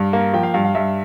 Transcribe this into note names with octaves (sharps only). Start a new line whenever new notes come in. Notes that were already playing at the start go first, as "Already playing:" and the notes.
Already playing: G2 F5
A#3
F3 G5
F5
G2 F5
F5
G2 E5